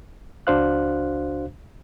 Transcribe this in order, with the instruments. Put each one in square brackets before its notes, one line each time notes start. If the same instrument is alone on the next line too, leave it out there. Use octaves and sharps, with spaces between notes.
[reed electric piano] C#2 D4 F#4 C5 F5 F#6